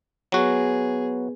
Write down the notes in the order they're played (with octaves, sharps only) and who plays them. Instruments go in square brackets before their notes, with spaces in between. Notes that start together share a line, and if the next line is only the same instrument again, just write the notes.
[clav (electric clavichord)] F#3 F#4 [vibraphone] B3 B4 [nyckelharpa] G#4